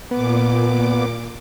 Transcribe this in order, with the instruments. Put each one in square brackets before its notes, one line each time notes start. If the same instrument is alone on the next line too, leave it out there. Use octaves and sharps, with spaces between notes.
[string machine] A#2 D6 [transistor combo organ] B3